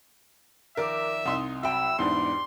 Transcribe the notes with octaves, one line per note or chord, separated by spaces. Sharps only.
D#3 F3 A#4 D5 E5
C2 D#4 C6 D#6
F#3 E5 G5 A5 B5 E6
E2 G#2 G3 D4 C6